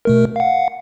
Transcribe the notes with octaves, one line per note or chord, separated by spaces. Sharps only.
B2 A3 A#4
F5 F#5